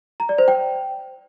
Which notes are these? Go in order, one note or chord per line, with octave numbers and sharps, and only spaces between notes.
A#5
D5
C5
G5